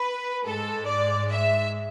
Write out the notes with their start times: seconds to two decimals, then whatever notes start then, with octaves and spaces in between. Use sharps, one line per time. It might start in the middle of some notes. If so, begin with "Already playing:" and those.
Already playing: B4
0.46 G#2 G#3 A4
0.88 D5
1.30 E5